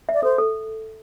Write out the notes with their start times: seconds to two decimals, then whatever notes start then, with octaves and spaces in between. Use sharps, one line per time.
0.09 E5
0.14 D5
0.23 A4 C5
0.38 A4